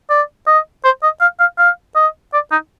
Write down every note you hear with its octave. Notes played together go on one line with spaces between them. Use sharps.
D5
D#5
C5
D#5
F5
F5
F5
D#5
D5
D#4